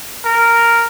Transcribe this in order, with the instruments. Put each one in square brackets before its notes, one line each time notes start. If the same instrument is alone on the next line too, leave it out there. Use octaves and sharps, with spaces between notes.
[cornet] A#4